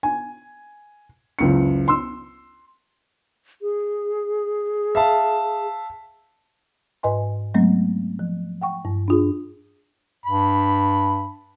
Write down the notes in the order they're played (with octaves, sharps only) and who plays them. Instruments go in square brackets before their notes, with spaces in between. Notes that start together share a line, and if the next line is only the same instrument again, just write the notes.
[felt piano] G#5
F#1 C#2 C#7
C6 E6
[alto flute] G#4
[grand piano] E5 F5 A5
[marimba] G#2 B4 D#5 G#5 C6
F#3 G#3 A3 B3 C4
F3
F#5 G5 C#6
G2
D4 F4 G#4
[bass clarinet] G2 [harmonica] B5